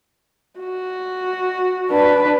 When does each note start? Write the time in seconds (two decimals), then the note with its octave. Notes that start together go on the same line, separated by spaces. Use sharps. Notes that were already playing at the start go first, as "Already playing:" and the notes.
0.60 F#4
1.90 D4 B4